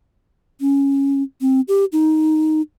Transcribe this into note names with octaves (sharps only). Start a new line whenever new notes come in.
C#4
C4
G4
D#4